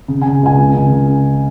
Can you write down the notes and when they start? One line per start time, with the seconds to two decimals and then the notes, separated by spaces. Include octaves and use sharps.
0.08 C#3
0.22 G#5
0.26 C#3
0.43 C#2 G#5
0.60 C#3
0.77 C#3